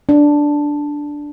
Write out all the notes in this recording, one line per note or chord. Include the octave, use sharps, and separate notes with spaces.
D4